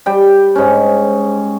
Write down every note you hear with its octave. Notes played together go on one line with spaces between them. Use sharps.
G3 G5
G#2 C#4